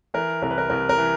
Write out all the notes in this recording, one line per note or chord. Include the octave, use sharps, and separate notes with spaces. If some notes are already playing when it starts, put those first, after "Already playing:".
E3 A#4
C2 A#4
B4
A#4
C2 A#4
A#4
E3